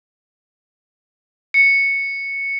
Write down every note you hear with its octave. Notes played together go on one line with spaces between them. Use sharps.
C#7